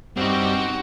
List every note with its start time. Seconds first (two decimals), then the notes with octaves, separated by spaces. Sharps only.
0.17 G2 C4 D#4 F#4